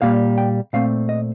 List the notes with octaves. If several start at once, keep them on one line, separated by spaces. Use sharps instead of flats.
A#2 G3 A#3 F5
G5
A#2 A3 C4 F5
D#5